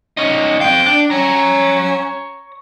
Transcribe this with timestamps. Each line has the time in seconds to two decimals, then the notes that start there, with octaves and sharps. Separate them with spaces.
0.17 C#4 D#4
0.60 C4 F5 G5
0.86 D4
1.10 C#4 C#5 A#5